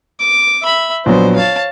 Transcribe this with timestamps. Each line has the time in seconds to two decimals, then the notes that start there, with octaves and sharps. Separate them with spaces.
0.19 D6
0.62 E5 B5
1.06 A#1 F#3 B3 C5
1.36 C#5 F5 A5